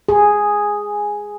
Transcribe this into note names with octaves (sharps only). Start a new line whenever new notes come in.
G#4